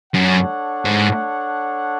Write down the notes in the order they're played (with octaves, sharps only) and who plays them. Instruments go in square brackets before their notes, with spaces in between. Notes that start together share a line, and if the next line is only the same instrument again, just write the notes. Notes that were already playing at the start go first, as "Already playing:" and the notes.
[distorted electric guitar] F#2 [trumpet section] D4 A4 C#5 F#5
[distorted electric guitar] G#2